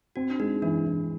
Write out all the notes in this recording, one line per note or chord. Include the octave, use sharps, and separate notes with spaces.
C4 F#4
D4
G#3 D#4
E3 D4
E3